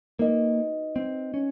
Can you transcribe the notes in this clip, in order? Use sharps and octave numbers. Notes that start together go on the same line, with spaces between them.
A#3 D#4 F#4 B4 D#5
C4
C#4